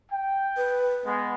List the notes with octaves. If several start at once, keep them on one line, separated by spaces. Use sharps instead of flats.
G5
B4
G#3 B3